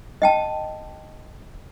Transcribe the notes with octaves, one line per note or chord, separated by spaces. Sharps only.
D#5 G5 A5